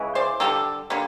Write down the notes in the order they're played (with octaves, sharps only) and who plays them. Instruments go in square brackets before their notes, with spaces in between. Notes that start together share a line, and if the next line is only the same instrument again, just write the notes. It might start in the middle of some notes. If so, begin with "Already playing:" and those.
Already playing: [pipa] C#3 E3 G#3
C5 D5
D3 G3 A#3 G4 A4
D3 G3 A#3